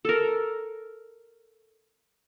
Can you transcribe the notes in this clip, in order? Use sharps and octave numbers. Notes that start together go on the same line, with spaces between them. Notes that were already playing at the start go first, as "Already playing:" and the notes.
A4 A#4